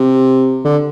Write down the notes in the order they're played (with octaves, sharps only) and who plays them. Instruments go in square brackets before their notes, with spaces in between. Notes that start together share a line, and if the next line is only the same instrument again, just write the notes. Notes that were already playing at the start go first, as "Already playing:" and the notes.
Already playing: [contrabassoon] C3
D3